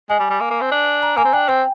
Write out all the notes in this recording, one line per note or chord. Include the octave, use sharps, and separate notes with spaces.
G#3 G#5
G3
G3
A#3
A#3
C4
D4
A#5
A#3 G#5
C4
D4 G5
C4 G5